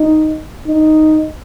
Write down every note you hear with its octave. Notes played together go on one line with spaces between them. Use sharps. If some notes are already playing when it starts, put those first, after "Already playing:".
Already playing: D#4
D#4